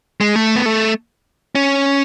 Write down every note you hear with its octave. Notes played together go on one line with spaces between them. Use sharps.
G#3
A3
B3
A3
C#4